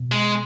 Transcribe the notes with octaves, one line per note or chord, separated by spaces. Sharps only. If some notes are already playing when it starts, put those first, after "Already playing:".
Already playing: B2
G#3